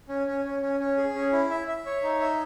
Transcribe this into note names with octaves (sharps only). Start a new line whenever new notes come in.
C#4
C#4
C#4
C#4
C#4
G#4
C#4
E4
E5
E5
C#5
D#4
E5